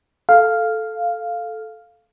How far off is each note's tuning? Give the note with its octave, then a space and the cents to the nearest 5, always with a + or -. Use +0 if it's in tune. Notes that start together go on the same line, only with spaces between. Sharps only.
A4 -5 F5 +0